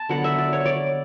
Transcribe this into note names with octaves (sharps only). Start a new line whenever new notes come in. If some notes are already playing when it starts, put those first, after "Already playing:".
Already playing: A5
D3 F#3 B3 F#5
E5
D5
C#5
D5